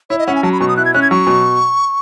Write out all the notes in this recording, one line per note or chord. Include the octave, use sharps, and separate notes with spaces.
E4 C#5
D#5
C#4 F#5
G#5
F#3 A5
B5
B2 C#6
D#6
E4 F#6
G#6
C#4 F#6
G#6
F#3 C#6
B2